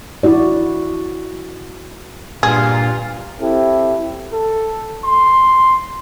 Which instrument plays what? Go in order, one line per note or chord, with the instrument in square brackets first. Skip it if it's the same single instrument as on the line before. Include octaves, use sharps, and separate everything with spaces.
[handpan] E4 F#4 D5
[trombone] G2 [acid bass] A#2 [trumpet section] F4 [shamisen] G#4
[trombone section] C4 E4 G4 A4
[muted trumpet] A4
C6